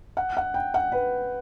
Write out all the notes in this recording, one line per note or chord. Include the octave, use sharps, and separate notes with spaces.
F#5
F#5
G5
F#5
B4